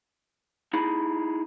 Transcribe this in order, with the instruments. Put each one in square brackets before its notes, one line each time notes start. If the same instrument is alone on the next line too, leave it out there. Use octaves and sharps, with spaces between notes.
[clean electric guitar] D#4 E4 G#4 B5